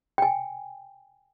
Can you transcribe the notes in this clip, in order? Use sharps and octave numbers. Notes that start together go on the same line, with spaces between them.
G5 G#5